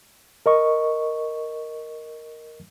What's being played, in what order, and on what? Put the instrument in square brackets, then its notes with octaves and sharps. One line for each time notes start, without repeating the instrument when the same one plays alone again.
[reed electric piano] A#4 D#5 C#6